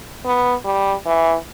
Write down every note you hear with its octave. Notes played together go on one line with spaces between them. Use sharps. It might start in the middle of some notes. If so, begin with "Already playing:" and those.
B3
G3
E3